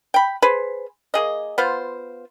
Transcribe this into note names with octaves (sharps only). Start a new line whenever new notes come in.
G5 B5
G#4 B4 C5
A#3 G#4 D#5
B3 F4 C5